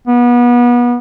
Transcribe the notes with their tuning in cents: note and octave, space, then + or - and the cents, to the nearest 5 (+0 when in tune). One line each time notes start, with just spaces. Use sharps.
B3 -30